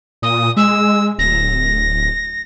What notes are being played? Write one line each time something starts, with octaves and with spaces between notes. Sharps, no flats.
A#2 D#6
G#3 E6
D1 A#6